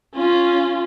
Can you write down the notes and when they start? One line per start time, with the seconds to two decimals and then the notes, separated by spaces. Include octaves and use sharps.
0.15 C#4 F4